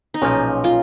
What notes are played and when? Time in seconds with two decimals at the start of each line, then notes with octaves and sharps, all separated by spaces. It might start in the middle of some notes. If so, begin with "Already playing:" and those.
0.14 D#4
0.22 B1 A#2 F3 C#4
0.64 F4